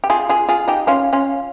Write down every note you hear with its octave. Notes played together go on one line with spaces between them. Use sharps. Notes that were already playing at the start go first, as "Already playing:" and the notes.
G4
F4 G#4
F4 G#4
F4 G#4
D#4 G4
C#4 F4
C#4 F4